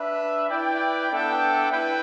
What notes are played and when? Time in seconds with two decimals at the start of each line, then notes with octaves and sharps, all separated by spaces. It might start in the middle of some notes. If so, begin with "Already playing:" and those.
Already playing: D4 B4 E5
0.49 E4 B4 D5 G5
1.11 B3 D4 A4 E5 G5
1.71 E4 B4 G5